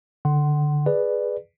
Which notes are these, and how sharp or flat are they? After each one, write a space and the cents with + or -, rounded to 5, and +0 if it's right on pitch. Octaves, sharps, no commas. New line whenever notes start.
D3 +0 F#5 +25 C6 +0
G#4 +0 B4 +0 D5 +15